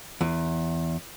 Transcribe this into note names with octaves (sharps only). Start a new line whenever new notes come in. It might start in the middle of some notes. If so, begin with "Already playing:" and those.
E2